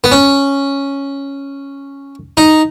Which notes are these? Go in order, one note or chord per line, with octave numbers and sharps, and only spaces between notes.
B3
C#4
D#4